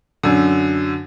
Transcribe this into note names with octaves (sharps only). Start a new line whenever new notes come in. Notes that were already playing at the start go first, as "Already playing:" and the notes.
F#2 D3